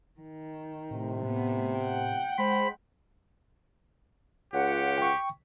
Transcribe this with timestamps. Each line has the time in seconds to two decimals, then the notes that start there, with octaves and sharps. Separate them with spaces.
0.20 D#3
0.91 A2 C3
1.24 A2 B3
1.78 F#5 G5
2.38 G#3 C5 B5
4.54 C#2 F4 G4 C#5 F#5
4.98 G5 C#6